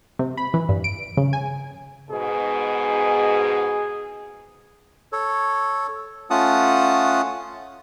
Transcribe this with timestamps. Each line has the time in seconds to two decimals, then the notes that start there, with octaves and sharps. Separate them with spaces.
0.19 C3
0.38 B5
0.54 E3
0.69 G2
0.84 D7
1.17 C#3
1.33 G#5
2.10 G#2 B2 G#4
5.12 A4 C#5
6.30 A3 C#4 F4 F#5 A5 D#6